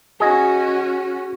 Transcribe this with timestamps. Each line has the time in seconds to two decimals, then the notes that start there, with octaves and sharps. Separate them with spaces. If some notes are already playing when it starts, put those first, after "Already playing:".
0.20 C#4 F#4 G#4 D#5